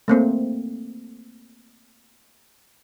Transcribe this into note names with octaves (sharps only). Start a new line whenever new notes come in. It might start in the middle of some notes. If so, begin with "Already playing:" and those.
A3 A#3 C4